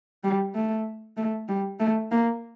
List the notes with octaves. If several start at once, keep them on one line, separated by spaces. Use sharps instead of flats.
G3
A3
A3
G3
A3
A#3